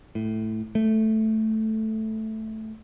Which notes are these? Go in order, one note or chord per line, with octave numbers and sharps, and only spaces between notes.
A2
A3